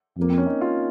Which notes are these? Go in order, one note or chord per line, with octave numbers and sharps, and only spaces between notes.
F2 A#3
C4
C#4
D#4
F4